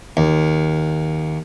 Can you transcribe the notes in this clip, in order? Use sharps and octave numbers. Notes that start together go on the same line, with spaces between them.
D#2